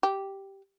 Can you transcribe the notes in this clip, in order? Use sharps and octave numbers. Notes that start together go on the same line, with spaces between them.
G4